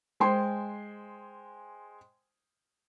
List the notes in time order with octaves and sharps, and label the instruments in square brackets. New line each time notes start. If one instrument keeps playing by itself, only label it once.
[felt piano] G#3 C5 G5 G#5 C6